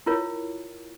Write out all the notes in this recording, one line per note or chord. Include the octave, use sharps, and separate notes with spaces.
E4 F4 A#4 C#5